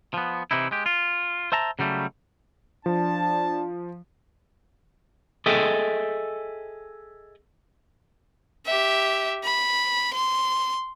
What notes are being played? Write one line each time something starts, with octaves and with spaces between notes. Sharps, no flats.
F3 B3
C3 E3 D#4 E4
G#3 G4
F4
C5 E5 A5 A#5
C#3 F#3 G3 A3
F3 D4 A5
G#4 A4 D#5 E5 G5
G4 E5
B5
C6